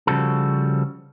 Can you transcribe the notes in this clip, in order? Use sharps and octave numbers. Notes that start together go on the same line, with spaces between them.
C#3 F3 G3 F#4 A4